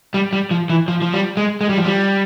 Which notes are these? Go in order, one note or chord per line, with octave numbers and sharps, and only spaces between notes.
G3
G3
F3
E3
F3
F3
G3
G#3
G#3
G3
F3
G3